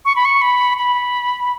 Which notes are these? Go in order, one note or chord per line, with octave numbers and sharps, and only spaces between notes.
C#6
B5
C#6
B5
B5